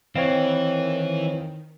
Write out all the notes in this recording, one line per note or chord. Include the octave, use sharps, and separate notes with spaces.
D#3 E3 C4 C#5 D#5 F5